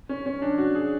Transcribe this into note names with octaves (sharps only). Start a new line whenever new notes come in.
C#4
C#4
D4
F#4
G#4